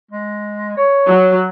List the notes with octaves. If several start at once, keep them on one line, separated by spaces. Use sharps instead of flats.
G#3
C#5
F#3